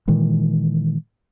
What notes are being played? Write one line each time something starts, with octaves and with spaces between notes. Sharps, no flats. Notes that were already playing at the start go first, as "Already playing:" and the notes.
A#2 D#3 E3 G#3